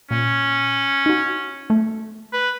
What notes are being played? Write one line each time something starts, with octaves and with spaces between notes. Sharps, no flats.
A#2 C#4
D#4 F#4
A3
B4